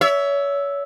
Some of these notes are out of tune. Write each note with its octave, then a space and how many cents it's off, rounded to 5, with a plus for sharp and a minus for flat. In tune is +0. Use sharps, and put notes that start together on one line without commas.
C#5 +30 E5 +0